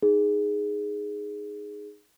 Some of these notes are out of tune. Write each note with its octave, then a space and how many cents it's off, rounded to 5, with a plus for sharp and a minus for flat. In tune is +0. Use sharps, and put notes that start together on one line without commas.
D#4 -10 G#4 +0